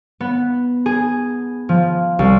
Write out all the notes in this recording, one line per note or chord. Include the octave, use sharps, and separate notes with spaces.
B3
G#4
F3
C2